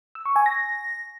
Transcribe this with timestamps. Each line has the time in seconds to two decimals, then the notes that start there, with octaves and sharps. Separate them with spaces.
0.15 E6
0.26 C#6
0.36 G#5
0.46 A#6